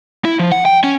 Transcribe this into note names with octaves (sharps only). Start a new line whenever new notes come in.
E4
F3
F#5
G5
C#4